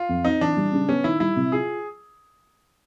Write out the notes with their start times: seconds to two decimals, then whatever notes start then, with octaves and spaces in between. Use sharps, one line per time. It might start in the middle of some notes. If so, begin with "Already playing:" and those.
Already playing: F4
0.09 F2
0.25 C4 D#4
0.41 E3 D4
0.57 G3
0.72 C#3
0.89 B3 C#4
1.04 D#3 E4
1.20 G3 E4
1.36 C3
1.52 F4 G#4